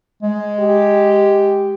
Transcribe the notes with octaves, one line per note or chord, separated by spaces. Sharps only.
G#3
G4